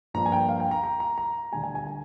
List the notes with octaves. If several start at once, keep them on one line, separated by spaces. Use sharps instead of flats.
G2 F3 A#3 A#5
G#5
G5
F5
G5
A#5
A#5
A#5
A#5
D2 D3 G3 G#5
G#5
G#5
G#5